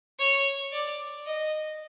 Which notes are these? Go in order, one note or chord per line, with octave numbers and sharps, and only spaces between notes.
C#5
D5
D#5